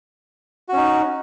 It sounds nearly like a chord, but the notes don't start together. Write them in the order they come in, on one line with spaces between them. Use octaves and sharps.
F#4 C#4 D#4